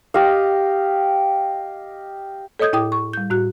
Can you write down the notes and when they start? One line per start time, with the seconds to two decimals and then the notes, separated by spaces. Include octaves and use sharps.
0.14 G4 D#5 F5
2.59 A4 C#5 D#5 D#6 G6 G#6
2.73 A2 E4 G5 D6 D#6
2.92 C#6
3.13 G3 G6
3.30 A2 F#4 F#6